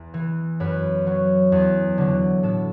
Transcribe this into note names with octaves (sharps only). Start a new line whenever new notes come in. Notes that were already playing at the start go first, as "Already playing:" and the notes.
Already playing: E2
E3
F#2 B4
F#3
E2
D3 F#3
A2 A4